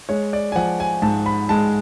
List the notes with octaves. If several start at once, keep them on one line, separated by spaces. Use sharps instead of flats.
G#3 C#5
D5
G#5
F3 F#5
G#5
G#2 A5
B5
G#3 A5